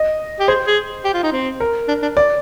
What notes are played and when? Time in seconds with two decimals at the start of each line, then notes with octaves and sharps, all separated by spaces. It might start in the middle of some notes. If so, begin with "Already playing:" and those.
Already playing: D#5
0.39 G4
0.48 G#4 C5
0.67 G#4
1.04 G4
1.14 F4
1.23 D#4
1.32 C4
1.60 A#4
1.88 D4
2.02 D4
2.17 D5